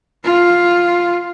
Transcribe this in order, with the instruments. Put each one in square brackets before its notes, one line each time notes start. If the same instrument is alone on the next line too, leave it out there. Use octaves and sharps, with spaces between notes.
[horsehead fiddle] F4